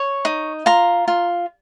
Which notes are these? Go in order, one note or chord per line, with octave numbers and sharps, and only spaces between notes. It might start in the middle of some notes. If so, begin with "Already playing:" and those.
Already playing: C#5
D#4
F4 A#5
F4